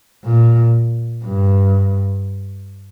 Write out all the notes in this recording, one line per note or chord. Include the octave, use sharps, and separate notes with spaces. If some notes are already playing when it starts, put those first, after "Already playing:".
A#2
G2